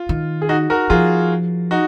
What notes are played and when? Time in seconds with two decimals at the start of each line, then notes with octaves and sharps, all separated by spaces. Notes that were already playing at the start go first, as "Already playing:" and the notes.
Already playing: F4
0.09 D#3
0.42 G#4
0.49 D#4 F#4
0.70 F#4 A#4
0.90 F3 F4 G#4
1.71 D#4 F#4